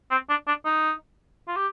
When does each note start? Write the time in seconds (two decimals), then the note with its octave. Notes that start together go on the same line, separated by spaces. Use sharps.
0.11 C4
0.29 D4
0.47 D4
0.65 D#4
1.48 F4
1.56 G4